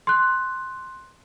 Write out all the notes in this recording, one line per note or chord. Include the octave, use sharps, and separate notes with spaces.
C6 F#6